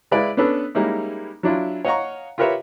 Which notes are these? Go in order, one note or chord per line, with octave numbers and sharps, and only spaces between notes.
G#3 E4 B4 D5 F5
B3 C#4 D4 A4 B4
G3 G#3 A#3 C#4 D#4 E4
F#3 D4 E4 F4
C#5 D#5 F5 F#5 A#5 C#6
F4 G4 A#4 B4 C#5 E5